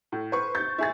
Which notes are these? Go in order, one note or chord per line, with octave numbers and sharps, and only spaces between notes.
A2
B4 C5 C#6
G6 A6
E4 G#4 A6